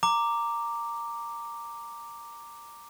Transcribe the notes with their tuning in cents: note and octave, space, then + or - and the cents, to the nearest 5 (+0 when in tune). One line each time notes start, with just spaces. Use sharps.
A#5 -10 D6 +0